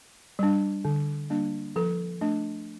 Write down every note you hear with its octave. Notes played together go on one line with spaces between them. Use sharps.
G3 D4
D3
G3 A#3 D4
F3 A4
A3 D4